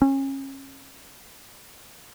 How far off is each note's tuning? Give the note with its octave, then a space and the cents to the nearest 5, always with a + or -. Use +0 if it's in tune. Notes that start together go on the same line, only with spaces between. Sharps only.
C#4 -30